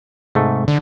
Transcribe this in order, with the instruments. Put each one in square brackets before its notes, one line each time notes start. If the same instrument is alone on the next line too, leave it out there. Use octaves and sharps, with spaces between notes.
[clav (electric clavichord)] G#2 A3 [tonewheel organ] C3 G#3
[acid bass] D3